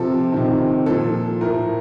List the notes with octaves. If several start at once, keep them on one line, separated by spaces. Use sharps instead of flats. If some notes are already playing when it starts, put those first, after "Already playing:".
Already playing: C3 F3 A4
C3 D#3
A#2 F3 A4
A2 F3 A#4